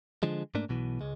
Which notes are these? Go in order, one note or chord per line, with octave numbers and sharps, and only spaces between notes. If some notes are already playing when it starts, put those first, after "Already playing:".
D3 F3 G#3
G#2 A3 A#3 D4
B1 B2 E3
C#2 G#3